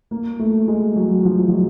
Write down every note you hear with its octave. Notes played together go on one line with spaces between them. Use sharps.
A#3
A3
G#3
F#3
F3
F3
F#3